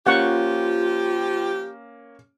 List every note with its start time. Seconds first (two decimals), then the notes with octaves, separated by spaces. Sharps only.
0.07 F3 A#3 C#4 F4 G4 F#5 C#6